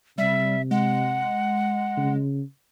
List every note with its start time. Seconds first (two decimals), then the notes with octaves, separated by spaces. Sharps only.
0.18 C3 G3 E5
0.71 G#3 F#5
1.97 C#3